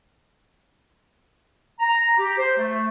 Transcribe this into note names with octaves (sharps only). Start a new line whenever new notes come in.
A#5
G4
C5
A3